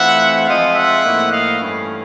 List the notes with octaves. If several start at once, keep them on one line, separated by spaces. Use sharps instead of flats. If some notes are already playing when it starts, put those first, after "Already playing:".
Already playing: E3 A3 C4 F4 E5 F#5
F3 G#3 C4 F4 D#5 F5
E5 F#5
A2 F3 A#3 D#4
D#5 F5
G2 E3 A3 C#4